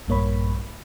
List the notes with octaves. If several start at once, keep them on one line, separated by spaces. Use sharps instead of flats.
A#1 G2 A#3 C#5 B5